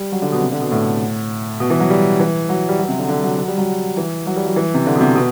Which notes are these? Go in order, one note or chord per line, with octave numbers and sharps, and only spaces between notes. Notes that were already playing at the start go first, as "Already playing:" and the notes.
Already playing: G3
F#3
D3
B2
C3
D3
B2
A2
B2
E3
F#3
G3
E3
F#3
G3
F#3
C3
D3
D3
F#3
F#3
G3
F#3
E3
F#3
G3
F#3
E3
C3
D3
B2
C3
B2